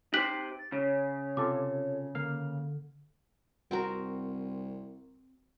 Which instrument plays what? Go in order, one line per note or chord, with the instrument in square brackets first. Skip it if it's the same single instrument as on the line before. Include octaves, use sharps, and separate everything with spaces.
[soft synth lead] D#4 [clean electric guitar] G4 C5 [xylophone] F#6 B6 F#7
[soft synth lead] A6
[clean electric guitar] C#3 [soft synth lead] C#5
[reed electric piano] C3 F4 A4 [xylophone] D6
[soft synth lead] D3 [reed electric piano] A#3 F5 F6
[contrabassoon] C2 [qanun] C4 F#4 A#4